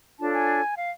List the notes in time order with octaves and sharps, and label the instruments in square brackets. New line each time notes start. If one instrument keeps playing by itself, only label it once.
[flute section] D4 F4 A4 C#5 A5
G#5
F5